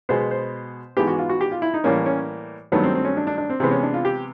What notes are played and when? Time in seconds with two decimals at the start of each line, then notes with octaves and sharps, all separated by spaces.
0.09 B2 G#3 B3 C5
0.31 C5
0.97 G#2 E3 G#3 B3 G4
1.08 F#4
1.18 F4
1.29 F#4
1.41 G4
1.52 F4
1.62 E4
1.74 D#4
1.84 A2 E3 G3 A#3 C#4
2.06 C#4
2.72 G2 D#3 F#3 A3 B3
2.83 C4
2.95 C4
3.05 C#4
3.17 D4
3.27 D4
3.38 D4
3.50 C4
3.60 C3 E3 G#3 B3 C4
3.71 C#4
3.83 D4
3.94 F4
4.05 G4